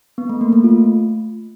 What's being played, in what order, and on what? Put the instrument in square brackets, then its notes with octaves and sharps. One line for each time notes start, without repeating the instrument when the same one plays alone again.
[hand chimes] B3
A3
A#3
A3
F4